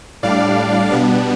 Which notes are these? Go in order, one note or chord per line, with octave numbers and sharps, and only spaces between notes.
A2 G3 D4 D5 F5
B2 G3 B3 D4